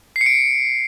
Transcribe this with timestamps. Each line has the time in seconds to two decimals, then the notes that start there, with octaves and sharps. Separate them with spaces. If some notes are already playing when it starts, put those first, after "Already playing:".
0.16 C7
0.21 C#7
0.26 D7